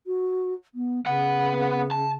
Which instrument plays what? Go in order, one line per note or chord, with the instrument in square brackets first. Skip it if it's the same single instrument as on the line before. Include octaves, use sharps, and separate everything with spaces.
[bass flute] F#4
B3
[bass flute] C#3 [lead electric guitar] B3 F#5
[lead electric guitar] A5